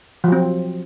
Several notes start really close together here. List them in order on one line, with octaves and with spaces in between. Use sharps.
F3 F#3 C4